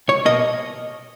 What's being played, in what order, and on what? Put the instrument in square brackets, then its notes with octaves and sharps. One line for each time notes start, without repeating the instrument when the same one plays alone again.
[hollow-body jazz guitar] C#2 C#5
B2 A#3 D#5